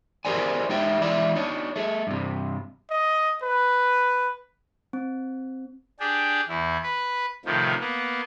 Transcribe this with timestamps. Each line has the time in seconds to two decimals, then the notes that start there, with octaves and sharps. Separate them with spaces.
0.25 G4 G#4 A#4 C5 D5 G#5
0.69 G#3 D#4 G4 C#5 E5 G5
1.01 E3 G#3 E4 D5 E5
1.35 D4 D#4 C#5
1.76 A3 G#4
2.07 G2 C3
2.90 D#5
3.43 B4
4.93 C4
6.00 D4 G4 G#4
6.48 E2 E4
6.84 B4
7.45 A2 C3 D#3 F3
7.80 A#3 B3